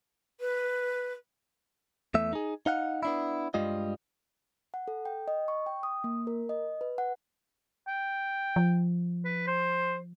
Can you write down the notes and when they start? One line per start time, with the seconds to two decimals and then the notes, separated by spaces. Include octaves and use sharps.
0.40 B4
2.14 E2 A3 E5
2.33 D#4 G#4
2.66 D#4 F5 F#5
3.03 B3 D4 E4
3.54 G2 G3 G#3 F4 D#5
4.74 F#5
4.88 A4
5.05 G5
5.28 D#5
5.48 C#6
5.66 G5
5.83 D#6
6.04 A#3
6.27 A#4
6.49 D#5
6.81 B4
6.98 F#5
7.88 G5
8.56 F3
9.25 B4
9.47 C5